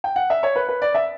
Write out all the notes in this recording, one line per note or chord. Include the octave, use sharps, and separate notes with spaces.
G5
F#5
E5
C#5
B4
B4
D5
E5